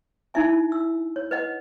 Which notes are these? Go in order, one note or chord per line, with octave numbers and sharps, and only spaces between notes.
D#4 E4 E5 G#5
E6
C#5
B4 D#5 F#5